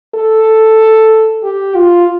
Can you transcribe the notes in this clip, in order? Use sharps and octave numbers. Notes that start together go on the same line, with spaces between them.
A4
G4
F4